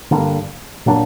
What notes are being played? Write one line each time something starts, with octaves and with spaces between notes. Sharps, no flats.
G2 D3 A#3
A#2 F#3 A#3 D4